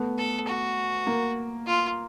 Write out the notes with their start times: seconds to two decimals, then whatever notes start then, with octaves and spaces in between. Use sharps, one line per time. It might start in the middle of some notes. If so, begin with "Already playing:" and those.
Already playing: A3 B3
0.18 A4
0.47 F#4
1.07 A#3
1.66 F4